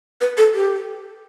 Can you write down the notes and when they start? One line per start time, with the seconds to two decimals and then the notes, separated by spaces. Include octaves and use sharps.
0.21 B4
0.38 A4
0.54 G4